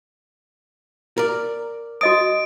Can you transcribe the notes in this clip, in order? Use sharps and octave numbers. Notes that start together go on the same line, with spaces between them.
A#4 D5
F#4 D#5 D#6 D7